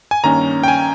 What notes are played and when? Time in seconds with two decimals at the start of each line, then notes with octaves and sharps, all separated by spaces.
0.11 G#5
0.24 G2 D#3 A#3 C#4 A#5
0.63 G5
0.68 G#5